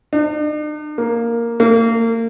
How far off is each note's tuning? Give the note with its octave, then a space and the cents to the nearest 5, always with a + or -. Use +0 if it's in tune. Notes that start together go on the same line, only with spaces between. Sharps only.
D4 +45
A#3 +0
A#3 -30